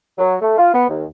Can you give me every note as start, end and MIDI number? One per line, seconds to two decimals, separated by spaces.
0.19 0.35 54
0.42 0.58 57
0.58 0.73 65
0.74 0.88 59
0.89 1.05 39